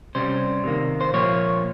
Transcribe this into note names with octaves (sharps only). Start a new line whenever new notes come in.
C3 G3 C#4 C5
C3 D#3 A#3
C5
A#2 F3 A#3 C#5